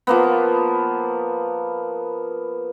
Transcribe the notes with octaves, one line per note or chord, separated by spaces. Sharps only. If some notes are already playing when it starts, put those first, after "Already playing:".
F3 A#3 B3